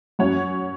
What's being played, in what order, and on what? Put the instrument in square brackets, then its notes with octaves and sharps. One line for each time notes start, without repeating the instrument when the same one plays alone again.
[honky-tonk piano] F#2 F#3 C#4 C#5 F#5